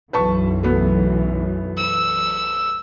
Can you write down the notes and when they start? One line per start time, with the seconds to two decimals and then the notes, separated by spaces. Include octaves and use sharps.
0.13 B1 F#2 E3 B4 A5 C#6
0.63 A3 B3
1.77 E6